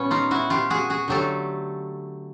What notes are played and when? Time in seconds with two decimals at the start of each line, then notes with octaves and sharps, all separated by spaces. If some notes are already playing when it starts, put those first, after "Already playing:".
Already playing: A#2 G3 B3 C#4
0.11 D#4 F4
0.31 E4 F#4
0.50 F4 G4
0.70 F#4 G#4
0.90 F#4 G#4
1.08 D3 F#3 A3 G4 A4